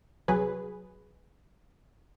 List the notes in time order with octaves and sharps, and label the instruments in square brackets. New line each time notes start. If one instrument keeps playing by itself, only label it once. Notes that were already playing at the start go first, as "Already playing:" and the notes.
[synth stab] C2 F#3 G#4 B4